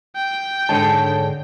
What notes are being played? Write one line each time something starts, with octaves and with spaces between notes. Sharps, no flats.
G5
G#2 D3 G#4 C#5 A5